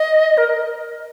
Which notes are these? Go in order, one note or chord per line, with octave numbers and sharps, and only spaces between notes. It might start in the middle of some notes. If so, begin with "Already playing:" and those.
Already playing: D#5
A#4